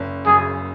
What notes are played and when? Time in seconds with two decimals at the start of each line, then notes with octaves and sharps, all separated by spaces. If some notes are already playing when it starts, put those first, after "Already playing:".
Already playing: F#1
0.26 F#2 C#3 G#4